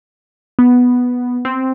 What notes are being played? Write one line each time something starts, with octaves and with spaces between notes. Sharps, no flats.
B3
C4